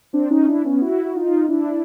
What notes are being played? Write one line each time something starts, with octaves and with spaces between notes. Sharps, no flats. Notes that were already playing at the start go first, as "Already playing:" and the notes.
C4 D4
C#4 D#4
D4 E4
B3 C#4
E4 F#4
F#4
D#4 F4
D4 E4